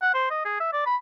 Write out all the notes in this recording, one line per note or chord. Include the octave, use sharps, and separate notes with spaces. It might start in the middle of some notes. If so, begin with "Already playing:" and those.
F#5
C5
D#5
G#4
E5
D5
B5